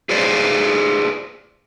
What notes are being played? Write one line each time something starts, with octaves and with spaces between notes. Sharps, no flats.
G#4 B4 C5 D5